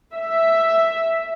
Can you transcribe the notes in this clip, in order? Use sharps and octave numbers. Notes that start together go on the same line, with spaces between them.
E5